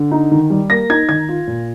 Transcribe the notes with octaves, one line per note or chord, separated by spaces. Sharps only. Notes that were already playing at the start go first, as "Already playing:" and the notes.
Already playing: D3
D#4
D#3
G3
A#3 A#6
D#4 G#6
D#3 G#6
F4
A#2